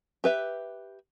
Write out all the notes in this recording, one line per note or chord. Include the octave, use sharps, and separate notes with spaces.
G4 B4 E5